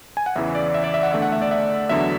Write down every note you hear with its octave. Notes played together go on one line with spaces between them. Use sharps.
G#5
F#5
E2 C#3 E3 E5
D5
E5
D5
E5
F#5
E2 D3 A3 E5
F#5
E5
D5
E5
E2 D3 F#3 B3 E5